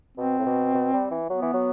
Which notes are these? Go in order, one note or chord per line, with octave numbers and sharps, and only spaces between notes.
B2 C4
A2
B2
B2
G3
E3
F#3 B3
E3
F#3